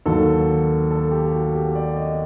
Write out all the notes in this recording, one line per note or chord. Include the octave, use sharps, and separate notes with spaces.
D#2 D#3 F#3 A4
A4
G4
F#4
G4
D5
D#5